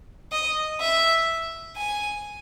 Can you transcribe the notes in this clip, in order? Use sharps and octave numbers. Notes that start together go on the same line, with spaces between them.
D#5
E5
G#5